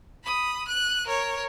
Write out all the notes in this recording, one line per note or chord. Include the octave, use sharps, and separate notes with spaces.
B5 D#6
F#6 D#7
A#4 C#5